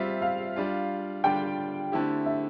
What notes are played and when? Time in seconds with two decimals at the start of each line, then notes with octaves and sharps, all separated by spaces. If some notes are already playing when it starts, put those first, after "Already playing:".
Already playing: G3 C4 F4 E5
0.22 F5
0.56 G3 D4 F4
1.24 D3 G3 D4 F4 G5
1.92 D3 A3 C4 E4 G4
2.26 E5